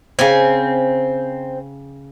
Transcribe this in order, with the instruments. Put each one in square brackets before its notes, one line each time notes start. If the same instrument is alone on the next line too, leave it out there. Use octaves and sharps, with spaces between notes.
[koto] C#3 G#5 [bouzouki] C4